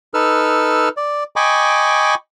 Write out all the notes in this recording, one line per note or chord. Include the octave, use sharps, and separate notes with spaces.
D#4 A4 B4 E6 F6
D5
D#5 G5 G#5 B5 C#6 D6